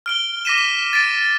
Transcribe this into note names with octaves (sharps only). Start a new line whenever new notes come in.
F6 D7 G7
D6 A#6 B6 D#7 E7
B6
A6 B6 D7